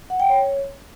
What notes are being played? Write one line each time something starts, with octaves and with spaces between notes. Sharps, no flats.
F#5
G5
C#5